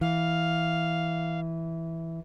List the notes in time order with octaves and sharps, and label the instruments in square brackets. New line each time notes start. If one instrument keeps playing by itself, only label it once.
[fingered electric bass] E3 [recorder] F5